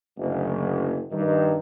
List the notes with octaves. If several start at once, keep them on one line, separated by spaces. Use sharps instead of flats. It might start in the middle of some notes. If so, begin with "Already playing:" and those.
F#1 D2
G2 D#3